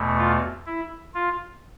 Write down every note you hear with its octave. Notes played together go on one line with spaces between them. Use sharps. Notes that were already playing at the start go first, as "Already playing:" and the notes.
Already playing: E2 B2 A3
F4
E4
F4